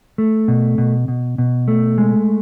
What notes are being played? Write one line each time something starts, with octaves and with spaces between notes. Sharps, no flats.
A3
B2
B2
B2
B2
A3
G#3